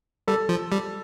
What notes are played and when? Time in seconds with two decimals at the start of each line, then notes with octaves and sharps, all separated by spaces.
0.28 G3 A4
0.49 F3
0.72 G3